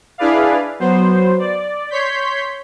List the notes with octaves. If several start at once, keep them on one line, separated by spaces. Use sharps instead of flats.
D4 E4 G#4 B4 D5 F5
F#3 B3 C5
D5
C#5 C6 G6 B6